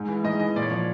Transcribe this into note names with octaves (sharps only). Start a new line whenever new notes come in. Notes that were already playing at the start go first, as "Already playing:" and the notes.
Already playing: G#2
E3
G#2 D#5
E3 D#5
A#2 D5
C#5
F3 D5